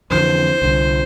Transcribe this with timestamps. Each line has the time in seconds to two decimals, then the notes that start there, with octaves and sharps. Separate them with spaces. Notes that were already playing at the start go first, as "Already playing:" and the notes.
0.10 F2 D3 E3 C5
0.62 C2 D3